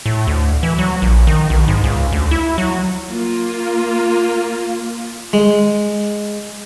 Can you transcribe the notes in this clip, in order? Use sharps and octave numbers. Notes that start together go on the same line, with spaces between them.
A2
D2
E3
F#3
A#1
D#3
B1
G#2
C#2
D2
E4
F#3
A#3 F4
G#3